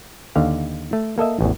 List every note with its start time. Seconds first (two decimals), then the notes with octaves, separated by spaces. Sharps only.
0.36 D#2 D3 F5
0.93 A3
1.18 A#3 A4 D#5 E5
1.41 A1 E2